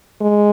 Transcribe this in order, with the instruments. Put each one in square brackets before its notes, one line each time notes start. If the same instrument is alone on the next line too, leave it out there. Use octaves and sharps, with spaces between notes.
[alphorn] G#3